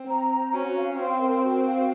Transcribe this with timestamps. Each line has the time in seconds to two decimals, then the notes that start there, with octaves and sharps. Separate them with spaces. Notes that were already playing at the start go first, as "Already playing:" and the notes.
Already playing: C4
0.08 A#5
0.30 C5
0.53 C#4 F#4
0.75 F5
0.97 C4 C6
1.20 A#4
1.43 F#4
1.65 F5